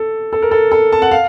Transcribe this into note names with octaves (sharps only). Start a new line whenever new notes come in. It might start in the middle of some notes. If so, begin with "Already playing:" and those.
Already playing: A4
A4
A#4
A4
A4
A5
F#5
F5